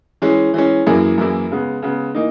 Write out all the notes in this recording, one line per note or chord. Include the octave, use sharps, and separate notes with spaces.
E3 G#3 C#4
E3 G#3 C#4
F#2 E3 A#3 E4 G#4
F#2 E3 A#3 E4 G#4
C#3 G#3 B3
C#3 G#3 B3
E3 A#3 D#4